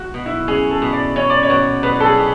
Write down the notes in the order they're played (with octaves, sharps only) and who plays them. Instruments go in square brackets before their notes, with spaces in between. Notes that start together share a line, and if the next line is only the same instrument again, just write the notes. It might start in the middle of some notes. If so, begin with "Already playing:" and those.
Already playing: [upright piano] F#4
[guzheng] B2
[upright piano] E4
[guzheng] C#4 [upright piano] G#4
[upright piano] A4
[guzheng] B2
[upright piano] D5
[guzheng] C#4 [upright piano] C#5
[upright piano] D5
C#5
[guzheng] B2
[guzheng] B2 [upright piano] B4
[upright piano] A4
G#4
[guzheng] B2